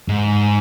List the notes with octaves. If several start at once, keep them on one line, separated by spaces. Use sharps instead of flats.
G#2